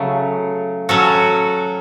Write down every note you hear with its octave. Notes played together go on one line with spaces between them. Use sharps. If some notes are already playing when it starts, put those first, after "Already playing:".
Already playing: C#3 F#3 A3
F#3 C#4 F#4 A4